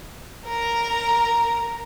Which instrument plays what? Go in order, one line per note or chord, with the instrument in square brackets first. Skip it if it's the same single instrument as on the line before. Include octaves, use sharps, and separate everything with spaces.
[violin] A#4 A#5